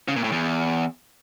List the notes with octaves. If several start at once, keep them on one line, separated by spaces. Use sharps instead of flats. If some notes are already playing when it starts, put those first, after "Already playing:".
C#3
A#2
A2
E2